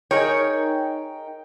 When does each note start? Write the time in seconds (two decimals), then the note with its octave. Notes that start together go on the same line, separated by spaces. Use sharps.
0.11 D#4 G#4 A#4 C#5 G5